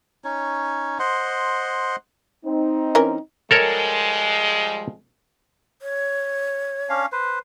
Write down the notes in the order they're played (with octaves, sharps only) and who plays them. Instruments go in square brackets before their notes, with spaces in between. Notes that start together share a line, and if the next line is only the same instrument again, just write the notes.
[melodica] C#4 D#4 C#5
C5 D#5 F#5 C6
[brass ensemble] C4 D#4
[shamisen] E3 C#4 A#4
[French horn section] F3 G3 G#3 [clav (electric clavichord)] A4 A#4 C#5
[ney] C#5
[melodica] C#4 D4 F5
B4 C5